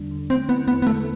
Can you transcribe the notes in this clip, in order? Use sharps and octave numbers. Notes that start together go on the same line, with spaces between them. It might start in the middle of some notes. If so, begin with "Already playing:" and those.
Already playing: E2 D3 G3 D4
D3
A3 C4
B3 E4
E2 B3
B3
D3 A3